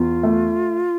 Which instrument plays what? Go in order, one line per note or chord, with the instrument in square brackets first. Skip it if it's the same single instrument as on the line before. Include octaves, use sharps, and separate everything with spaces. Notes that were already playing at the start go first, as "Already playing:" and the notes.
Already playing: [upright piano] E2 [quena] F4
[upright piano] A3